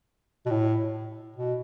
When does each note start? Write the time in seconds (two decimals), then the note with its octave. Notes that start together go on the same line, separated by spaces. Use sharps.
0.46 B2
0.50 A2
1.36 B2